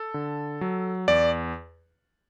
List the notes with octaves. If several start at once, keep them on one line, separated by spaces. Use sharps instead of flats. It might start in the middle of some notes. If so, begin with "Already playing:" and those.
Already playing: A4
D3
F#3
E2 D5